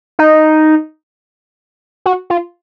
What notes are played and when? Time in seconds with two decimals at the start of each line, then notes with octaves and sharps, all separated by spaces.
0.19 D#4
2.06 F#4
2.30 F4